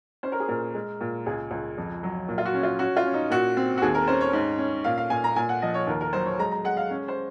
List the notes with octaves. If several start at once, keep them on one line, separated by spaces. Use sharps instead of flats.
C#4 C5
A#4
G#4
A#2 A#4
G#3
A#2
C#2 G#4
C#2
F2
F#3
A#2
F4
F#4
C#4
F4
C#4 F#4
F4
C#4
D#4
A#2 F#4
C4
F#4
D#2 G#4
A#4
C#4 C5
C#5
G#2
C#4
A#2 F5
F5
A#2 G#5
A#5
A#2 G#5
F#5
F3 D#5
C#5
D#2 A#4
A#4
F#3 C5
C#5
G#3 A#5
A#5
G#3 F#5
F5
C#4
C5